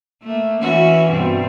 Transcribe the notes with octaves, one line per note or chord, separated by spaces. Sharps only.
A3 A#3
E3 C#4 F#4
G2 B2 C4